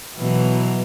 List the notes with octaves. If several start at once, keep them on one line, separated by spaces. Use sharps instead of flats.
B2 E3 F#3